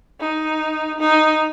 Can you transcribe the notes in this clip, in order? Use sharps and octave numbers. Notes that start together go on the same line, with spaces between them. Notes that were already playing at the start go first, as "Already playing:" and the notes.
D#4
D#4